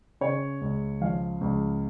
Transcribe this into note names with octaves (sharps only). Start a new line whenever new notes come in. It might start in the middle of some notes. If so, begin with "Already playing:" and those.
C#3 C#5
C#2
F3 F5
C#2